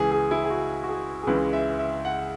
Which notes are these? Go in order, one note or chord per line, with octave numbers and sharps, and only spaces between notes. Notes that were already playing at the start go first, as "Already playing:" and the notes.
Already playing: C#2 C#3 E3 G#4
G#4
E4
G#4
F#4
F#4
G#4
G#4
C#2 C#3 E3 G#3 B4
E5
E5
F#5